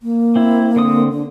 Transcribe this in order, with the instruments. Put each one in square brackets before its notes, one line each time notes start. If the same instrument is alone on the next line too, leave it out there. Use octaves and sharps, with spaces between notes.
[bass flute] A#3
[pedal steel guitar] C4 E4
D3 C4 D#6
[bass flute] D3